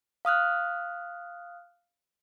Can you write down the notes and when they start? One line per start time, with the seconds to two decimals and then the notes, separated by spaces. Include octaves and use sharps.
0.25 F5 D#6 F6 F#6